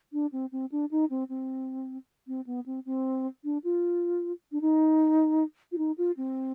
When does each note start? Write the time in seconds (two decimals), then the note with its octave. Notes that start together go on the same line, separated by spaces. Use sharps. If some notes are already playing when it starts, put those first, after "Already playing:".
0.13 D4
0.32 C4
0.52 C4
0.72 D4
0.91 D#4
1.10 C4
1.29 C4
2.28 C4
2.47 B3
2.66 C4
2.86 C4
3.44 D4
3.64 F4
4.52 D4
4.61 D#4
5.72 F4
5.78 D#4
5.98 F4
6.17 C4